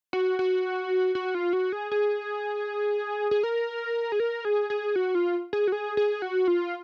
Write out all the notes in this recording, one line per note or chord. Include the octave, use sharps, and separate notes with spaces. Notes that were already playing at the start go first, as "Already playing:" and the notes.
F#4
F#4
F#4
F4
F#4
G#4
G#4
G#4
A#4
G#4
A#4
G#4
G#4
F#4
F4
G#4
F#4
G#4
G#4
F#4
F4